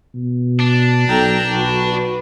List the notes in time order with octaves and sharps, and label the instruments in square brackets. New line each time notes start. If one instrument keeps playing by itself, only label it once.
[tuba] B2
[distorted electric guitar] D4
[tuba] B1 [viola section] A4 G5 A#5
[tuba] B1 [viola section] F#4 B4